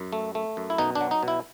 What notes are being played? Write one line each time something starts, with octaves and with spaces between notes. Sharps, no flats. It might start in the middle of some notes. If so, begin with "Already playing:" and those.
Already playing: F#2
A3
A3
F#2
E4
B2 D#4
D4
F#3
D#4
B2
E4